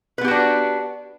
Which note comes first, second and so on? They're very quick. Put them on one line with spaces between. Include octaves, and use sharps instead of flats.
B4 B3 G4 F#4 D4